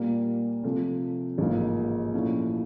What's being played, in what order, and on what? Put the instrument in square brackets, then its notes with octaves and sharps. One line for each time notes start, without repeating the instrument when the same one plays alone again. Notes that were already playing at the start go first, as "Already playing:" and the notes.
Already playing: [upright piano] A#2 G3 A#3
C3 F3 A3
A1 G#2 F3 A#3
A#2 F3 A3 C#4 E4